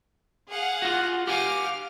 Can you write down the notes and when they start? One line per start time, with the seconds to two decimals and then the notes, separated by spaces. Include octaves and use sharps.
0.49 G#4 F5 F#5
0.82 F4 F#4
1.27 G4 F5 F#5 G#5 D6 F6